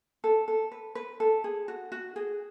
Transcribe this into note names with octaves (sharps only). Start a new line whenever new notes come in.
A4
A4
B4
B4
A4
G#4
F#4
F#4
G#4